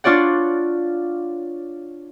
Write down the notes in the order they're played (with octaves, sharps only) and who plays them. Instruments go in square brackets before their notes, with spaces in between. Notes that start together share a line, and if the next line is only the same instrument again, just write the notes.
[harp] D4 F4 C#5 D5 F#5